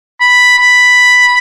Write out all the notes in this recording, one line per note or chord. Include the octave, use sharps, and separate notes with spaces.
B5
B5